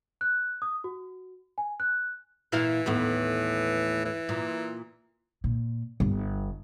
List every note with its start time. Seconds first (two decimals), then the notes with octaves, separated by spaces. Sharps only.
0.21 F#6
0.62 D#6
0.84 F#4
1.58 G#5
1.80 F#6
2.52 A#2 E3 E4 F5
2.86 D#2 A2 B3
4.05 E3
4.29 A#2
5.44 A#2
6.00 G1